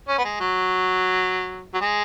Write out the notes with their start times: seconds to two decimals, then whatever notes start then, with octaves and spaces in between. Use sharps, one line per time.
0.09 C#4
0.18 B3
0.25 G#3
0.40 F#3
1.74 F#3
1.81 G#3